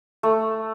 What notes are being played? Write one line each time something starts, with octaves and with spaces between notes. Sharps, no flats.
A3